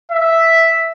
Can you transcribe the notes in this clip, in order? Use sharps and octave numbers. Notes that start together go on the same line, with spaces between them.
E5